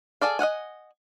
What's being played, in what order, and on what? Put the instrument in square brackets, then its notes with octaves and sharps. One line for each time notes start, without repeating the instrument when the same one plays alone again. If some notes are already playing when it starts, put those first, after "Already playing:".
[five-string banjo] G#4 A4 D5 F5
D#5 F5 F#5 G#5